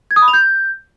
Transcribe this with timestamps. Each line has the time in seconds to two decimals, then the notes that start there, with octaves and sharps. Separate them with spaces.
0.11 G#6
0.16 D#6
0.22 B5
0.28 F7
0.33 G6